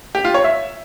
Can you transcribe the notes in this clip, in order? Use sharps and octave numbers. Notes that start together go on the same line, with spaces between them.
G4
F4
C#5
E5